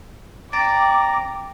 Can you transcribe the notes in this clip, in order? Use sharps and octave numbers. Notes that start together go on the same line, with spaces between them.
C4 D5 A#5 D6